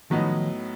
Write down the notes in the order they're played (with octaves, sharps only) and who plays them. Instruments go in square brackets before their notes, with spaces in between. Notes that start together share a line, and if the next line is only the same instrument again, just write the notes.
[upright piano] A2 F#3 B3 D#4 [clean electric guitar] D#3 F3